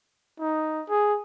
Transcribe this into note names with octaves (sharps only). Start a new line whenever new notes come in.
D#4
G#4